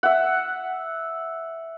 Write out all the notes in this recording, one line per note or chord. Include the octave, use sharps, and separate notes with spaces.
E5 F#5